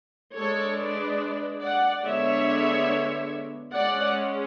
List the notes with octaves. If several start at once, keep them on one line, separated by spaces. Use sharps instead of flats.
G#3 D4 A4 C#5
B4 D5
D5 F#5
D3 G#3 B3 D4 C#5 E5
G#3 C#4 D5 F#5